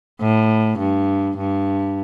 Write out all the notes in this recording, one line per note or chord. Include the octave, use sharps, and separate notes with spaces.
A2
G2
G2